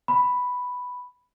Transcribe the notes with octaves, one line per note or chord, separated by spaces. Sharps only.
B5